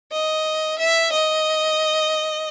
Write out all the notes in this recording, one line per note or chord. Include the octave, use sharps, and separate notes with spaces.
D#5
E5
D#5